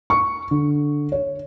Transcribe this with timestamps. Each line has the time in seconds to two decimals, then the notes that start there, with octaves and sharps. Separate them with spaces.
0.10 C#6
0.51 D3
1.12 C#5